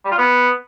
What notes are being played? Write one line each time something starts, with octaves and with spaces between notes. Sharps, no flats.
G3
F4
B3